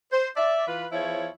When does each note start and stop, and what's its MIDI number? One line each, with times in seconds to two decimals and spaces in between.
0.12 0.29 72
0.37 0.67 74
0.37 0.67 76
0.67 0.86 52
0.67 0.86 65
0.67 0.86 71
0.92 1.28 40
0.92 1.28 53
0.92 1.28 64
0.92 1.28 73